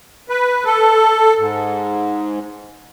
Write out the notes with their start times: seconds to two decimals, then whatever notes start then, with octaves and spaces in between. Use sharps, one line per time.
0.29 B4
0.65 A4
1.38 G#2